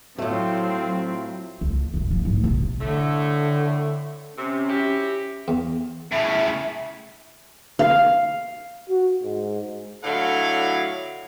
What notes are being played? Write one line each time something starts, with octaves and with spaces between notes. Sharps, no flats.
A2 F#3 A3 C4 F4
C#2
C#2
F#2 C3
F3
G#1 A3
A#1 C3
A2 D3 A3
C3 C#4
E4 F#4 G4
E2
A2 C#3 E5
F5
F#4
G#2
A2 D3 F#3 E4 F5